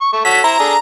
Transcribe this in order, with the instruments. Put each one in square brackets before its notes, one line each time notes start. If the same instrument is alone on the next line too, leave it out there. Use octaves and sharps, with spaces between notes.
[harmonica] C#6
A3 C#6
[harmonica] F#4 A4 C#5 [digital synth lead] B6
[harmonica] E4 C5 [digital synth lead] A#5
[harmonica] D4 G#4 A4